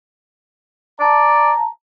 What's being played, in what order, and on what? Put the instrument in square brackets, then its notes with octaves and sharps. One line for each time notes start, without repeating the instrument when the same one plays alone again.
[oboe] D5 [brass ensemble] A5 A#5